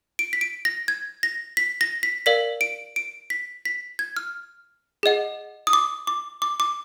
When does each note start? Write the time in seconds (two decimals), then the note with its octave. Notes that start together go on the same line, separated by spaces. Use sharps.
0.19 D7
0.33 B6
0.41 D7
0.65 A#6
0.88 G#6
1.23 A#6
1.57 B6
1.81 A#6
2.03 B6
2.26 A#4 D5 F5 B6
2.61 D7
2.96 D7
3.30 B6
3.65 B6
3.99 G#6
4.17 F6
5.03 G#4 D#5 F#5
5.67 D#6
5.73 D6
6.07 D6
6.42 D6
6.60 D6